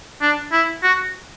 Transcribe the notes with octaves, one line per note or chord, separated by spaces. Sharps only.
D4
E4
F#4